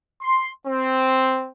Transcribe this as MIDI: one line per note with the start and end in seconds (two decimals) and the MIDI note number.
0.21 0.50 84
0.67 1.49 60